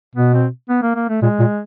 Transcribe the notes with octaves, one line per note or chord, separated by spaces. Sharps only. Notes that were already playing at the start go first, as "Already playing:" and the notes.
B2 B3
C4
B3
A#3
A#3
A3
A#2 G#3
A#2